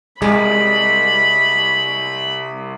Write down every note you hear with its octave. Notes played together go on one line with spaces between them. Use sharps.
C2 G#3 B5